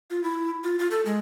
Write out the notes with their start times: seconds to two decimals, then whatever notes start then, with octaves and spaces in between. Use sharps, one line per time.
0.10 F4
0.23 E4
0.64 F4
0.79 F4
0.91 A4
1.06 G#3